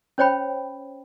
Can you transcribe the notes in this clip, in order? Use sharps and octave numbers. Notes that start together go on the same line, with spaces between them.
C#4 C5 C#5 G5 B5